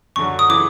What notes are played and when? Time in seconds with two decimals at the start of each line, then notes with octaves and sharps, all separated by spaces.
0.16 F#2 D3 F#3 C#6
0.39 D#6
0.49 C#3 E3 D6